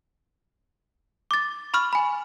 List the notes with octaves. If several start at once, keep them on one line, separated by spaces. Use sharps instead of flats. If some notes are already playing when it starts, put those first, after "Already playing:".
D6 A6
B5 C#6 F6
G#5 B5